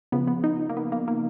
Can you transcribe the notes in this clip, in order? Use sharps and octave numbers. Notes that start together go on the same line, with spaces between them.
C#3 F3 B3
B3
D#4
A#3
B3
A#3
A#3